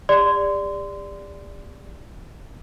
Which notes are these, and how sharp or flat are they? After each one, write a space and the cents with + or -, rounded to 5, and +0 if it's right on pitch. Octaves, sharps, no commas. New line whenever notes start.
G4 +45 D5 +0 C6 -25